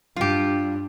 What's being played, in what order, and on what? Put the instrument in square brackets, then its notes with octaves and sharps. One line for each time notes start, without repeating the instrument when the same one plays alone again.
[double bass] G2 D4 [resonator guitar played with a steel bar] F4 G4